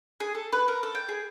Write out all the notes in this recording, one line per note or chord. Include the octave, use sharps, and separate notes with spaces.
G#4
A4
B4
A#4
A4
G5
G#4